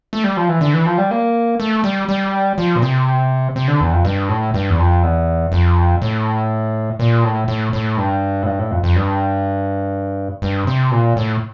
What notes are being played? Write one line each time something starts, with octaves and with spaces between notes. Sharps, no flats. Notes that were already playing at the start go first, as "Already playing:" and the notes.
A3
G3
F3
E3
D3
E3
F3
G3
A#3
A3
G3
G3
F3
A#2
C3
C3
D3
E2
F2
G2
A2
G2
E2
F2
E2
F2
A2
A#2
A2
A2
A2
G2
A2
G2
A2
F2
F2
G2
G2
C3
A#2
A2